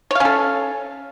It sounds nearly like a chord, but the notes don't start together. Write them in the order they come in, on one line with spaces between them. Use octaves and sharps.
C#5 F5 C#4 A4